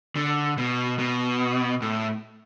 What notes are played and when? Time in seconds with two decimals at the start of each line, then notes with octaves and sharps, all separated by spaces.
0.16 D3
0.58 B2
0.99 B2
1.82 A2